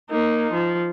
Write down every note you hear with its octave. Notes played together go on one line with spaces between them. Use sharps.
A#3 D#4
F3